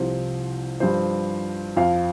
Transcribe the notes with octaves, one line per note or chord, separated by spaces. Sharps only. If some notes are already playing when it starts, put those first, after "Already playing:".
Already playing: C2 C3 F3 C5
G2 F3 C5
F2 F3 F5